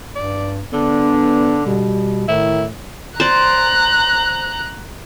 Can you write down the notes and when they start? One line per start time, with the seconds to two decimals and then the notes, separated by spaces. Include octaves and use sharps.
0.16 G2 D5
0.73 D3 B3 D4
1.66 B2 G3
2.28 A2 D#3 E4
3.20 C5 D5 A#5 F#6